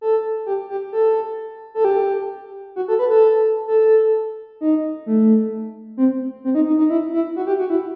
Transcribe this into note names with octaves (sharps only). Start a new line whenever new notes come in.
A4
G4
G4
A4
A4
G4
F#4
A4
B4
A4
A4
D#4
A3
C4
C4
D#4
D#4
D#4
E4
E4
F#4
G4
F#4
E4